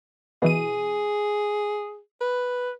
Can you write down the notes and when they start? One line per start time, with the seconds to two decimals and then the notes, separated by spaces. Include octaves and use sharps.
0.42 B2 E3 G#4 D#7
2.21 B4